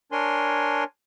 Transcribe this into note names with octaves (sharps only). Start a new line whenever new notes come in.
D4 A#4 C#5 G#5 C6